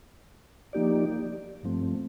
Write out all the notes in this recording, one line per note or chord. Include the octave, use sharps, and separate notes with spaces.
F3 A#3 D#4 G4 D5
G2 F3 A3 C4